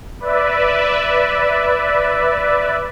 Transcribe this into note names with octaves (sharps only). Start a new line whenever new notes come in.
B4 D5 E5